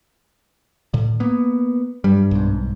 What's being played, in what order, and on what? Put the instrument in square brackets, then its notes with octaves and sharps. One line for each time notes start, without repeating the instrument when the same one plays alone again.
[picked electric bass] A2 D3
A#3 B3
[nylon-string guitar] G2 [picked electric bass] G3
[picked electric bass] B1 G#2